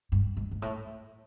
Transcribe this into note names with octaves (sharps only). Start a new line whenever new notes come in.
G2
G#2
G#2
A2